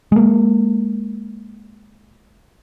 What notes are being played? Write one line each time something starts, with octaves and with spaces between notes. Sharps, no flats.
G#3 A#3